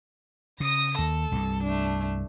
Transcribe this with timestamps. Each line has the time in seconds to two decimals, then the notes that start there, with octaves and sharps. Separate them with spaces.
0.60 C#3 D#6 A#6
0.98 D#2 A4
1.32 C2 G2
1.63 A3 D4